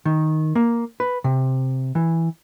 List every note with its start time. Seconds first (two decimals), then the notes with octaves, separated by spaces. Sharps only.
0.05 D#3
0.55 A#3
1.00 B4
1.24 C3
1.95 E3